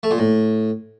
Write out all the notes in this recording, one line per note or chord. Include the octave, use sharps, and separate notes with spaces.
A3
A#2
A2